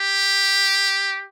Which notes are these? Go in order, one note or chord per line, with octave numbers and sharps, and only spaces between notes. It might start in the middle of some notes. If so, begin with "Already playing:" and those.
Already playing: G4